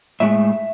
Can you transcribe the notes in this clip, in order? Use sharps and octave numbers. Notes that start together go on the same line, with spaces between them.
A2 G#3 E5